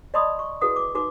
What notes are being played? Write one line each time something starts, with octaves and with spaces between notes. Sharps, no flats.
D5 D#5 A5 B5 C6 D#6
C#6
E4 F#4 G#4 B4 F#5 D#6
D6
D#4 F#4 B4 D6